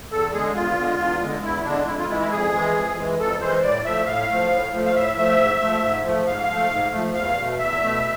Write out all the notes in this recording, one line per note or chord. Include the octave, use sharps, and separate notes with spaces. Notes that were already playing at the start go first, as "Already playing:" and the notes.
E2 A4
D3 G#3 G#4
E2 F4
D3 G#3
E2
D3 G#3
E2 E4
D3 G#3 D4
F2 E4
F4
E3 G#3 E4
E4
F2 G#4
E3 G#3
F2
E3 G#3
F2 A4
E3 G#3 C5
A2 D5
F3 A3 E5
A2 F5
F3 A3
A2
F3 A3
F5
A2 E5
F3 A3 E5
G#2
F3 A3
G#2
F3 A3
G#2 F5
F3 A3
G#2
F3 A3
E2 F5
B2 A3
E2 E5
B2 A3